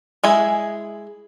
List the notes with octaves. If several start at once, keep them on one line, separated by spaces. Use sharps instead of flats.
G#3 E4 G#4